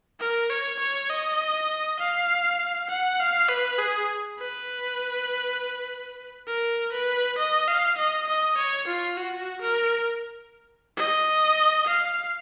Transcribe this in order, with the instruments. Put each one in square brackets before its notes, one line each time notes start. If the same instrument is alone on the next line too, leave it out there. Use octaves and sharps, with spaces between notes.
[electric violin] A#4
C#5
C#5
D#5
F5
F#5
F5
B4
G#4
B4
A#4
B4
D#5
F5
D#5
D#5
C#5
F4
F#4
A#4
D#5
F5